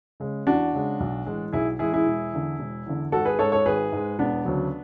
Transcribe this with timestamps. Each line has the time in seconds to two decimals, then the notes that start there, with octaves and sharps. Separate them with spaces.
0.20 C#3 G#3
0.47 E2 D4 F#4
0.73 C#3 G#3
1.00 B1
1.26 A2 E3 G#3
1.53 B1 E4 G#4
1.79 A2 E3 G#3 E4 G#4
1.93 E4 G#4
2.07 E1
2.33 E2 D3
2.60 E1
2.86 E2 D3
3.12 G#1 F#4 A4
3.25 G#4 B4
3.39 G#2 G#3 A4 C#5
3.52 A4 C#5
3.65 G#1 G#4 B4
3.92 G#2 G#3
4.19 E1 B3 D4
4.45 D2 C#3 F#3